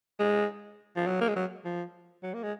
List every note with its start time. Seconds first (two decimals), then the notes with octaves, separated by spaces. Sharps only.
0.19 G#3
0.96 F3
1.07 F#3
1.21 A#3
1.29 G#3
1.36 F#3
1.65 F3
2.23 F#3
2.34 A#3
2.43 G#3